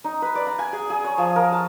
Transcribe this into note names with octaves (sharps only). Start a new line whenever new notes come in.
D#4
B4
D5
A#5
G#5
G#4
G#4
C#5
F3
A#4
A5